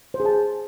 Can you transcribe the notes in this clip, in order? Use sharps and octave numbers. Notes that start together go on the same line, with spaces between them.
C5
G#4
A5